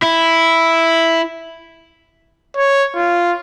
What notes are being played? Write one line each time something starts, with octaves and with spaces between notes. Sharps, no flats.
E4
C#5
F4